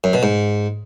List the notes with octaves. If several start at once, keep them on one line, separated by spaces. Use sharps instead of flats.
F#2
B2
G#2